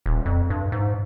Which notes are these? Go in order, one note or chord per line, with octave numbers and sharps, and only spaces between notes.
D#1
F2
G2
G#2